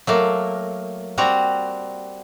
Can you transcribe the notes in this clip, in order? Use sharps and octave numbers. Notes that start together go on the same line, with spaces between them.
F#3 A3 A#3
G3 C4 F#4 A#5